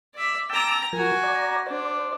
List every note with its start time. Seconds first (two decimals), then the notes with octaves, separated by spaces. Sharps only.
0.14 D5 E5
0.50 G5 A5 A#5 D6 E6
0.93 F3 F#4 A#4 G#5
1.24 D5 A#5
1.66 D4 C5 D5